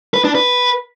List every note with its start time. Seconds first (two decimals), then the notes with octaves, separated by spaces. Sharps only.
0.14 B4
0.24 D4
0.35 B4